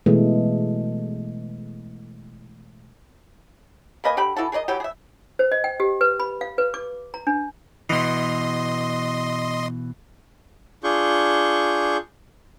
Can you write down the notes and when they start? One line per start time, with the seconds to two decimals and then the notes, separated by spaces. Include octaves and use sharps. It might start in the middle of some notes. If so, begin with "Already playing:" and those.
0.06 B2 E3 G#3 A3
4.04 A#3 B4 D#5 G#5
4.17 D3 G4 G5 B5
4.36 E3 E4 F#4 A4
4.52 G#4 A#4 D5 D#5
4.68 E3 F#3 G4
4.80 G#4 E5
5.39 C5
5.52 D#5
5.64 G5
5.80 G4
6.01 B4
6.20 B5
6.41 F5
6.58 B4
6.74 D6
7.14 A#5
7.27 D4
7.89 B2 E3 D#5 C6
10.84 D4 F4 G#4 C#6 G6